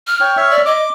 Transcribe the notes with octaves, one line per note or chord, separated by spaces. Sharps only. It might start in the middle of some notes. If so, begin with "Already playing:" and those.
F6
C#5 G5
C#5 E5
D5
D#5 D6